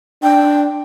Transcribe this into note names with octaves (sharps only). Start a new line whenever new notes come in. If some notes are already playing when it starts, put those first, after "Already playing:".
D4 G5